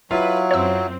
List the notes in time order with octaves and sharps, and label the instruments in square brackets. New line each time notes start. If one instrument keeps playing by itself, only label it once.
[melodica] F#3 [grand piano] E4 F4 F5 [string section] B4
[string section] F#2 C4 [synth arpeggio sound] C#5 E6